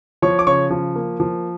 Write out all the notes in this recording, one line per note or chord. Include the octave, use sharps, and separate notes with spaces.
F3 C#5 C#6
D6
C#3 C#5 C#6
F3
A#3
F3